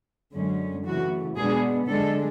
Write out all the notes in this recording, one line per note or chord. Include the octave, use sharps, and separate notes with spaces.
F#2 D3 G#3 C#4
C#3 E3 A3 F#4
B2 G#3 B3 D4 G#4
D3 G#3 D4 A4